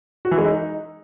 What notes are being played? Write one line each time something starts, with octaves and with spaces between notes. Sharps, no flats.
F#4
E3
G#3
D#4